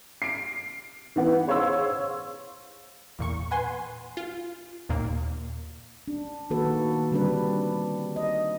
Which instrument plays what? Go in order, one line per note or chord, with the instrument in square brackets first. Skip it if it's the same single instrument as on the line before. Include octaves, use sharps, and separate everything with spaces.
[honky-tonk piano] C7 D7
E3 B3 F#5
G#4 C5 C#5 F5 C6 E6
[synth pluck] E2 A#2 C#6
B4 F#5 G#5 C6
F4
D#2 A#2 A#3
[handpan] D4
D#3 A#3 F#4 A4 B4
D3 G3 C4 D4 G4 B4
D#5